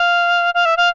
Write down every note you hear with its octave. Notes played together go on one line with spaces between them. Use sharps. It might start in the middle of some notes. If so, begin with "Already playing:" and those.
Already playing: F5
F5
E5
F5